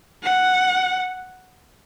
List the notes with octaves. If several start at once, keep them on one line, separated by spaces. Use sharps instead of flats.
F#5